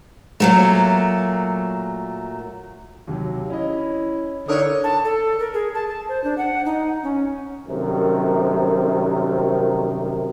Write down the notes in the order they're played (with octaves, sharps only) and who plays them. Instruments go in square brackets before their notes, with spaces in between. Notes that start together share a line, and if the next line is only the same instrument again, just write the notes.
[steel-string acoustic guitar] A#2 F#3 A3
[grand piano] D#2 C3 F#3
[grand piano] C#4 D#5 [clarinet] E4
[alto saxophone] D3 [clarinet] D#4 [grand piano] E4 A#4 D#6 [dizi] C#5
[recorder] A5
A4
A#4
G#4
A5
A5
C5
D4
F#5
D#4
C#4
[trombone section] C2 F#2 C3 D#3 A3 A#4